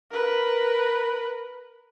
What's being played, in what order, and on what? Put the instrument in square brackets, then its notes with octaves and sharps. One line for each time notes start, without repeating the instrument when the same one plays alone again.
[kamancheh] A#4 B4